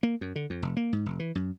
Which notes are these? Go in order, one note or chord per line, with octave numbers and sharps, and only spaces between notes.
A#3
F#2
D3
F2
F1
A#3
G#2
F1
E3
F#2